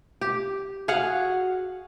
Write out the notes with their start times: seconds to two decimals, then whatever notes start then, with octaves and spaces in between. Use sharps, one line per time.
0.21 G4
0.88 F#4 G#4 F5 F#5